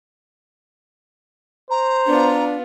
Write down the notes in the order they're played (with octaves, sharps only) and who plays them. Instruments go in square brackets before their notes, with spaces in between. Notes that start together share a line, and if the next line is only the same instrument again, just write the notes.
[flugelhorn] C5 [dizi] A#5
[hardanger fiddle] B3 F4 [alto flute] D4